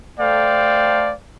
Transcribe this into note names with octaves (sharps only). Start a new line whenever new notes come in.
A3 A4 C5 D5 F5 G5